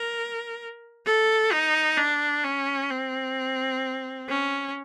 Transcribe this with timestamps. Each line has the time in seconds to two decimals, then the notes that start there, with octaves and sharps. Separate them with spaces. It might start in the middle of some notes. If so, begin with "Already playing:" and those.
Already playing: A#4
1.06 A4
1.52 D#4
1.97 D4
2.44 C#4
2.90 C4
4.29 C#4